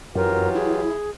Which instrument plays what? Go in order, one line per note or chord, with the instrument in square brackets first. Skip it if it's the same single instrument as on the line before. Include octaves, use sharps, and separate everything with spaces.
[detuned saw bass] F#2 [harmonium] E3 F4 G4 [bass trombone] F#3 [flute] A#4
[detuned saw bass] E4 [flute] G#4